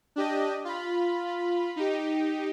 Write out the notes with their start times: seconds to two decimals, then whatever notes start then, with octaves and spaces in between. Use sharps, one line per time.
0.16 D4 G4 D#5
0.65 F4 B5
1.76 D#4 G4